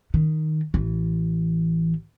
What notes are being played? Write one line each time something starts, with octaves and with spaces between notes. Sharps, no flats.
D#3
A1 E3